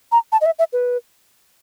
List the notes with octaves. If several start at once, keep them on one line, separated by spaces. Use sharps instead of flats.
A#5
A5
D#5
E5
E5
B4